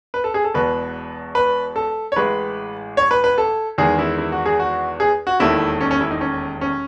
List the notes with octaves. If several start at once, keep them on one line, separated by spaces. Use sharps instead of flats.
B4
A4
G#4
A4
E1 E2 B2 B4
B4
A4
C#5
A1 A2 G#3 B4
C#5
B4
B4
A4
E2 D#3 G#3 G#4
E4
E4
F#4
G#4
F#4
G#4
F#4
E1 D#2 D#3 A3 E4
C#4
C#4
E4
D#4
C#4
C#4